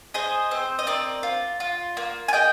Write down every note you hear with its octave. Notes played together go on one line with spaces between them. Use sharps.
G#4 C5 D#5
C4 C5
D#5
C4 A#4 D5
F4
F4
A#3
G#5
G#4 D#5 G5